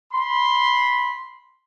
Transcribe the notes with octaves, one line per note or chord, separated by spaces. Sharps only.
B5 C6